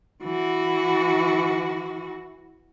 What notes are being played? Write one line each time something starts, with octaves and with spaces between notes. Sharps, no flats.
E3 F#4